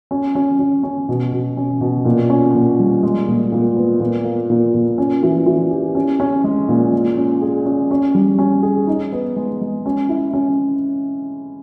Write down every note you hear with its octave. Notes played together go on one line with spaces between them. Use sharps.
C#4
C#4
C#4
C#4
B2
B2
C#4
B2
A#2
C#4
A#2
G3
G#3
A#2
A#2
B3
A#2
A#3
A#2
A#2
C#4
E3
E3
G4
C#4
C#4
G#3
A#2
G#3
C#4
G#4
C#4
C#4
G3
C#4
G#4
D#4
B3
G#3
G#3
C#4
E4
C#4